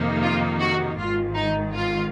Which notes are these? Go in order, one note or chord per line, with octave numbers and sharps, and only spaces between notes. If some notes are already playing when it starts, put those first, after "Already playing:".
Already playing: F2 C3 D#3 A#3 D#4
F4
F#4
G#1 G#2 D#3 F4
D#4
F4